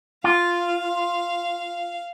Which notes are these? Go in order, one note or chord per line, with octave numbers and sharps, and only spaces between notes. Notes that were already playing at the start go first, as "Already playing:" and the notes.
F4 F5